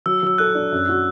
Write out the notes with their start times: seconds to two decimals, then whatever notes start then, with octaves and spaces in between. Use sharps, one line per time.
0.06 F#3 E6
0.23 F#3 E6
0.38 A4 F#6
0.55 D4
0.72 F#2
0.89 F#4